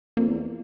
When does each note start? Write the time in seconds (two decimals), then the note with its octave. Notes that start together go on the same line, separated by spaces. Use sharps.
0.17 F2 A#3
0.28 E2